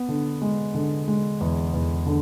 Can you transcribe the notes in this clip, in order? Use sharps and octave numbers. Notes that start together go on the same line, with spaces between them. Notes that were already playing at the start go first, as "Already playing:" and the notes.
Already playing: B3
D3
G#3
D3
G#3
E2
E2
D3